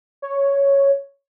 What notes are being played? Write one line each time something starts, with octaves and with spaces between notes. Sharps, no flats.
C#5